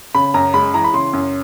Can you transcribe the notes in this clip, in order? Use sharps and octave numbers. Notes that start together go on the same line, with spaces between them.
C#3 B5
F#2 A#5
G#3 B5
E3 A#5
B5
C#3 C6
F#2